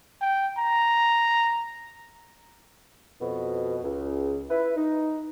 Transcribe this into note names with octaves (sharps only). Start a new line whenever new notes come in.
G5
A#5
F2 B2
C#2
E4 B4
D#4